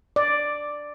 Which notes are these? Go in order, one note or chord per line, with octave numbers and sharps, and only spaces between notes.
D5